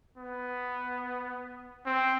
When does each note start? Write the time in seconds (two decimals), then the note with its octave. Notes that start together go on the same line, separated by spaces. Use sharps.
0.18 B3
1.86 C4